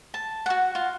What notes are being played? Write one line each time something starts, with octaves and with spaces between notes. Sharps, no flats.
A5
F#4 F#5
F4